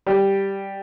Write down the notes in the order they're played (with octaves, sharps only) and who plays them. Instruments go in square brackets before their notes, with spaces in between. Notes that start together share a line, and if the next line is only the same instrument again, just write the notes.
[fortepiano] G3